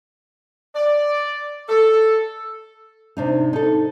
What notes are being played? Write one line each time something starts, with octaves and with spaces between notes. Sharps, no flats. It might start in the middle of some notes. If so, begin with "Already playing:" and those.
D5
A4
C3 D4 D#4
D#4 A4